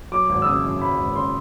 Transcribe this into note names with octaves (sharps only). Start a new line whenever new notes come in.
F#3 D6
G#1
E6
C#3 D#6
F#2
F#3 B5
G#1
C#3 C6